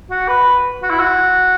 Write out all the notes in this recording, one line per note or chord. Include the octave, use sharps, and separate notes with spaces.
F#4
B4
F#4
E4
F#4